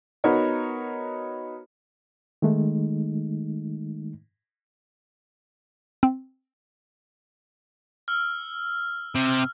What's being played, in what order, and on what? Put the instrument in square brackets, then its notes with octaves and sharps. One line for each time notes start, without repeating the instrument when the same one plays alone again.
[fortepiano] B3 D#4 F#4 A#4 C#5
[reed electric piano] D#3 G#3 A3 D#4
[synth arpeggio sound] C4
[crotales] E6 F6
[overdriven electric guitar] C3